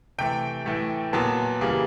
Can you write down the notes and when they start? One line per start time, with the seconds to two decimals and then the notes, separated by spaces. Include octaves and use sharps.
0.18 C3 E3 A3 G5
0.66 A2 E3 A3
1.13 A#2 F#3 B3 A5
1.61 C#3 E3 G3 A#3